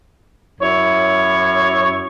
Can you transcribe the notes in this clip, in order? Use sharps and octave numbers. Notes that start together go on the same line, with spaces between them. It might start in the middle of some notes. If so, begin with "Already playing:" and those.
F#2 E4 C#5